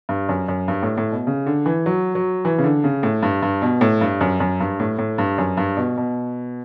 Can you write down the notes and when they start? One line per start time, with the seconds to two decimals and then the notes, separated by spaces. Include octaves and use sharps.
0.09 G2
0.29 F#2
0.48 F#2
0.68 G2
0.83 A2
0.98 A2
1.12 B2
1.27 C#3
1.46 D3
1.66 E3
1.86 F#3
2.15 F#3
2.45 E3
2.58 C#3
2.64 D3
2.84 C#3
3.03 A2
3.23 G2
3.42 G2
3.62 B2
3.81 A2
4.01 G2
4.21 F#2
4.40 F#2
4.60 G2
4.80 A2
4.99 A2
5.18 G2
5.38 F#2
5.57 G2
5.77 B2
5.97 B2